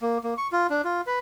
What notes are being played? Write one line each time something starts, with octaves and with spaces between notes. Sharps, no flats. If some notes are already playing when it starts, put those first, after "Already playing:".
A#3
A#3
C#6
F4
D4
F4
B4